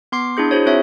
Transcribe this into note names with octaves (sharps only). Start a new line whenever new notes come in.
B3 C6 D6 C7
D4 E4 G#4 G6
E4 F#4 G#4 C5 C#5
C4 F4 C#5 E5